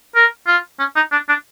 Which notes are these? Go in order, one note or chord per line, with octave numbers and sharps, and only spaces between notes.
A#4
F4
C#4
D#4
D4
D4